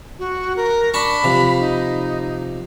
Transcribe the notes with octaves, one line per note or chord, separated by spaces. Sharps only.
F#4
A#4
D4 A5 B5 C#6
C3 F3
D#4